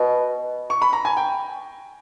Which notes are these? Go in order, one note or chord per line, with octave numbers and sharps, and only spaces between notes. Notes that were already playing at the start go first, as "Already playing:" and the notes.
Already playing: B2
C#6
B5
A#5
G#5
G5